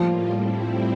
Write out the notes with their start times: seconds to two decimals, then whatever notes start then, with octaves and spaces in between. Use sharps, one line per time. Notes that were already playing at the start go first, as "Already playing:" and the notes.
Already playing: A2 F3 G3 A#3 F4
0.30 A2 G3 C4 E4